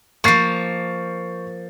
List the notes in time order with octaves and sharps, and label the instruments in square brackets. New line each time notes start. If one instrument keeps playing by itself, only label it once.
[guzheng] F3 A#3 [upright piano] C#6 A6 C7